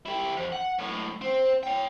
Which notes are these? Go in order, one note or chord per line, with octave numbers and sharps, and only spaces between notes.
E4 G4
F2
F#5
B1 A2
C4 C5
C#5 G5